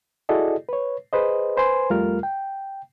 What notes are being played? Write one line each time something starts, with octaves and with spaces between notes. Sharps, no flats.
E4 F#4 G#4 A4 D5 D#5
B4 C#5
G#4 B4 C5 D#5
B4 C5 G#5 C6
F2 G3 A3 F4 A#4 F6
G5